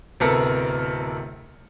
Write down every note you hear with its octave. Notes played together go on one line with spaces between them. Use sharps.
D1 C3 B3 A4 A#4 A#5